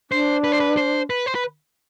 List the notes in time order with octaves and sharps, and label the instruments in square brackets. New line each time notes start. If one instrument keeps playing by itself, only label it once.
[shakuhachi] D4 [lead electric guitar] C5
[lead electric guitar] B4
C5
B4
C5
B4
C5
B4